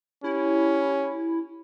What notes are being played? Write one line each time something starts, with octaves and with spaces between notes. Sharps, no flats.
C#4 E4 G4